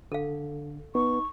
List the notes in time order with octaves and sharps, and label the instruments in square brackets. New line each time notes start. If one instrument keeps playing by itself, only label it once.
[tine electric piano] D3 [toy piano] A4 F5
[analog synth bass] B3 [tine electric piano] D#4 [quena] C#6